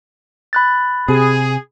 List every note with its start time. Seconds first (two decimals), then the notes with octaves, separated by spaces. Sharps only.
0.53 B5 F#6 A6
1.08 C3 G#4